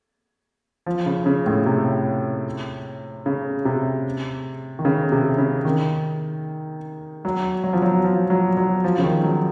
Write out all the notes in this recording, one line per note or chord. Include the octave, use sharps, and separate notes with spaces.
F3
C#3
C#3
A2
C3
C#3
C3
D#3
C#3
C3
C#3
D#3
F#3
F#3
F3
F#3
F3
F#3
F#3
F3
C#3
D#3
F#3